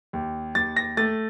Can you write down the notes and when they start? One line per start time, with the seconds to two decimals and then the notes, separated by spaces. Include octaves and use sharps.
0.13 D#2
0.55 D#2 A6
0.76 A#6
0.97 A3 A6